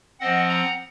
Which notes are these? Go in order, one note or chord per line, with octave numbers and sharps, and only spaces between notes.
F3 C4 D#5 F#5
F#5 A#5